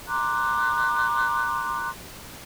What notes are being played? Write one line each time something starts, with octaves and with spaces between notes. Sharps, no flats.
A#5 C6 D6 F#6